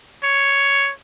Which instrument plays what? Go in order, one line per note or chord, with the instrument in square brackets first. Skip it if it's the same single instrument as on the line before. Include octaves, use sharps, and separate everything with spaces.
[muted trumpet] C#5